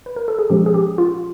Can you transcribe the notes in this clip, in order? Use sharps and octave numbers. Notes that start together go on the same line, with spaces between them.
B4
A#4
A4
G#4
A#2 F3 G#3 C#4 G4
G#4
G4
F4